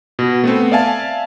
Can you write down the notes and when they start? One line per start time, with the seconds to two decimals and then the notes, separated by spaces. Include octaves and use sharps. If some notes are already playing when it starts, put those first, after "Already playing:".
0.19 B2
0.44 A3 B3 C4
0.72 D5 E5 F5 G#5 A5